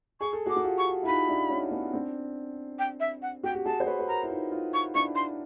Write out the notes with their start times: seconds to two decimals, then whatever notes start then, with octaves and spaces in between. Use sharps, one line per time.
0.20 G#4 C#6
0.33 A4
0.46 F#4 G#4
0.49 D6
0.56 F#4
0.64 F4 G4
0.78 C#6
1.03 E4
1.06 D#4 F4 B5
1.28 D4 E4
1.49 C#4 D#4
1.71 B3 C#4
1.93 C4 D4
2.79 G5
3.00 E5
3.22 F#5
3.43 F#4 G5
3.55 G4
3.65 F#4 G#4 A5
3.80 C5
3.87 B4 C#5
3.99 B4
4.08 G#4 A#4 A#5
4.23 E4
4.30 D#4 F4
4.52 D#4 F4
4.74 C#6
4.94 D4 E4 C#6
5.15 C6